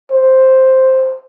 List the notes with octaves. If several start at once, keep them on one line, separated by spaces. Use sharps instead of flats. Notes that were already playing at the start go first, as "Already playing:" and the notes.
C5